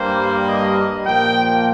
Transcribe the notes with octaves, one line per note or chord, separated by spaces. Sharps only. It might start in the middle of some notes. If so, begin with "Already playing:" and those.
Already playing: G2 G3 A#3 C5
D#5
A#2 F3 A#3 G5